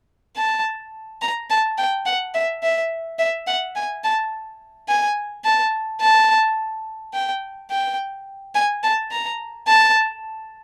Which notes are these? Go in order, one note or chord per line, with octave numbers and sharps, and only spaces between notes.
A5
A#5
A5
G5
F#5
E5
E5
E5
F#5
G#5
A5
G#5
A5
A5
G5
G5
G#5
A5
A#5
A5